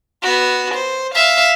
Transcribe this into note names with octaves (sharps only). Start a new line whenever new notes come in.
B3 F#4
C5
E5 F5